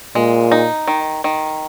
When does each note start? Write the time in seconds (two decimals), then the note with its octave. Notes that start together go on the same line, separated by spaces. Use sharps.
0.15 A#2 G#3
0.52 D#4
0.88 D#3
1.24 D#3